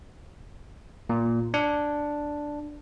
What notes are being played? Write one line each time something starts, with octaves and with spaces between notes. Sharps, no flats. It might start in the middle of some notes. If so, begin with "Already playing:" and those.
A#2
D4